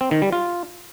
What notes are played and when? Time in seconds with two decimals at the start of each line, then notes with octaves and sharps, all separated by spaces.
0.01 C4
0.11 D#3
0.22 G3
0.33 F4